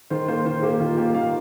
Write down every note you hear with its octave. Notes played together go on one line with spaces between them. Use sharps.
D#3 C5
A#3 C5
D#3 C5
A#3 G4
D#3 F4
A#3 G4
D#3 F5